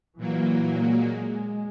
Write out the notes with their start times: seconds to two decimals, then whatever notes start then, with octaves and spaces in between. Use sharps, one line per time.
0.17 A#2 E3 F#3 A#3
0.82 G#3